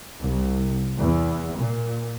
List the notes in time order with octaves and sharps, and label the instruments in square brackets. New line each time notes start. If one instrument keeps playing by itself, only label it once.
[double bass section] C2
E2
A#2